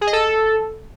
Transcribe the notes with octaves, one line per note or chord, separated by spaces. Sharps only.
G#4
D#5
A4